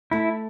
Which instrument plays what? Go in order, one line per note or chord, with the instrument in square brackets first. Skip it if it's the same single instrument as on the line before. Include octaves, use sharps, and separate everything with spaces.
[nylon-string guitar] A3 [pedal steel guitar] E4